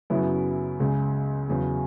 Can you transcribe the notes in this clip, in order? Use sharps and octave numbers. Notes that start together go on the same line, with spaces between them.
F#2 C#3 F#3 B3 E4
C#2 C#3 G#3
E2 C#3 F#3